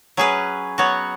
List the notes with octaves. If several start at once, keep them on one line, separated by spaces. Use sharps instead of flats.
F#3 C#4 G#4 B4
F#3 B3 F#4 C#5